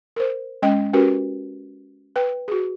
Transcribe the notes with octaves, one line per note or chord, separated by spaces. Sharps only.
A#4 C5
G#3 C#4 D#5 G5
C#4 F#4 G4 A#4 B4
B4 G5
F#4 G#4